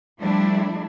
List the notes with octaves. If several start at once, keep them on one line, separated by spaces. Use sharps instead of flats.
F3 G3 A3 D4 E4